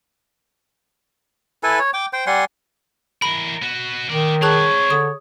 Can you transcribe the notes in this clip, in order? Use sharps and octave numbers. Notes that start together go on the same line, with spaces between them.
E4 A4 B4 G#5
C#5
G5 D6
C5 G5
G3 F#5 G#5 C6
E3 A#4 B5
B3 F#4
D#3 A#4 D5
C4 G#4 C#5 A5 B5 F#6
D3 D#6